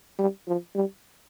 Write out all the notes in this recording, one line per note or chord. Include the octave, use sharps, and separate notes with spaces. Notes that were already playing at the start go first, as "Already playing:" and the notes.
G3
F3
G3